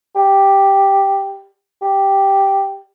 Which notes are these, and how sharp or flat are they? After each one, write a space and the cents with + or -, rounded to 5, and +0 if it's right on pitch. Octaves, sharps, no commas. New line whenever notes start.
G4 +0
G4 +0